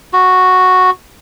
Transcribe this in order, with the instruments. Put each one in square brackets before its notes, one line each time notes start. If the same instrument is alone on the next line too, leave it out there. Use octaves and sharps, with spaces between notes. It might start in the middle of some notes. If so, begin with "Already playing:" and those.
[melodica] F#4